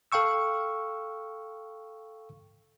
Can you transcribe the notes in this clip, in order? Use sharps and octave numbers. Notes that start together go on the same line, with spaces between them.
A4 F5 G5 C#6 E6